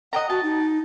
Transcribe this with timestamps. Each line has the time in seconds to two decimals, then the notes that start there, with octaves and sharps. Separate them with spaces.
0.13 D#5 F#5 G5 A#5
0.30 F#4 A5
0.43 D#4